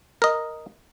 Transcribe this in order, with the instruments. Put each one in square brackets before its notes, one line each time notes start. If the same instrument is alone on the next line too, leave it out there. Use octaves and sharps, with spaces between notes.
[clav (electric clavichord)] A#4 D#5